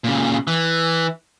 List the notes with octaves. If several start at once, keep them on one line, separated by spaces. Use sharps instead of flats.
A#2 C#3
E3